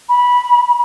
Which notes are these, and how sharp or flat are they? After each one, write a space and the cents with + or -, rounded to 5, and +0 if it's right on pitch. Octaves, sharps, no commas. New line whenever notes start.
B5 -15